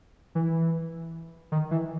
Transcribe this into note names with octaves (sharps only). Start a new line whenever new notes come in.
E3
D#3
E3